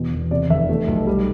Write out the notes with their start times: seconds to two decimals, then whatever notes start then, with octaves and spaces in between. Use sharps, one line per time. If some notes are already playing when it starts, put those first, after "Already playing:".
Already playing: E2 B2
0.12 E1
0.31 C3 D5
0.50 F1 E5
0.69 A3
0.88 B1
1.07 G3